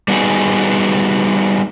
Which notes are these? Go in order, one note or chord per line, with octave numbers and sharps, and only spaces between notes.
G3 B3 D#4 F#4 G#4